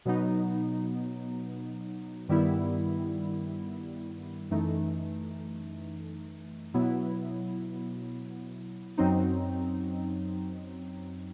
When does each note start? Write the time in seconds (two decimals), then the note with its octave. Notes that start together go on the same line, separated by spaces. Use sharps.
0.05 B2 F#3 B3 D#4
2.28 G2 D#3 G3 B3 E4
4.51 F#2 E3 A3 D#4
6.74 B2 F#3 B3 E4
8.98 F#2 F#3 C4 D#4